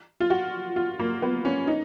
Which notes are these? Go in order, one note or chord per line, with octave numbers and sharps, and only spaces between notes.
F4
F#4
F4
A#3
B3
C#4
D#4